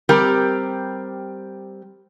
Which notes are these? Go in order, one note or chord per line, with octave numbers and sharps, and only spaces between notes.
G3 C4 G4 A#4